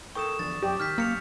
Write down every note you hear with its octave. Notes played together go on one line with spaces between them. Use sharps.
A4 A#4 G5 C#6 D#6 E7
E2 D3 F3 A6
F#2 G4 D5
D#3 F6 G6 B6
F#2 A#3 F6 C#7 F7